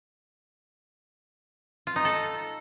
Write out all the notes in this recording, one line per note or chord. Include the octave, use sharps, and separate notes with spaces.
F4
D#4
A4